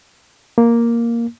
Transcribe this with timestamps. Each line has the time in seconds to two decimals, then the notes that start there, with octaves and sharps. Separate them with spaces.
0.58 A#3